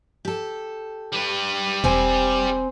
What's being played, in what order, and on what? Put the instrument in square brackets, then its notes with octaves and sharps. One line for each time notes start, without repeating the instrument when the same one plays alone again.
[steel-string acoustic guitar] G4 A4
[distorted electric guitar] G3 B4
[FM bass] E1 [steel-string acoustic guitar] C4 C5 G#5